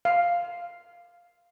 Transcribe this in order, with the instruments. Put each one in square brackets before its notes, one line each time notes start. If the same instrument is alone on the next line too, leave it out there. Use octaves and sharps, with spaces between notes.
[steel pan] F5